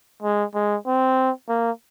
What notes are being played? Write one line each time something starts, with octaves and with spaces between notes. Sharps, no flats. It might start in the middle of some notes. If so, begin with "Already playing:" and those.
G#3
G#3
C4
A#3